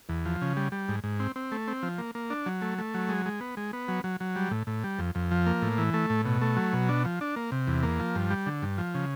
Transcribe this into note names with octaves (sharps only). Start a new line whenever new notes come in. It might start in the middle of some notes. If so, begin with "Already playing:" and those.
E2
F3
C#3
G3
G3
G#2
G#2
C4
C4
A3
C4
F3
A#3
A#3
D4
F#3
A3
A3
F#3
G#3
G#3
B3
G#3
B3
F#3
F#3
F#3
G3
A2
A2
G3
F2
F2
F3
A#3
A2
E3
A3
A2
B2
A3
F#3
B2
D4
F3
D4
A#3
C3
E2
A#3
F3
G2
G3
D3
G2
F3
C#3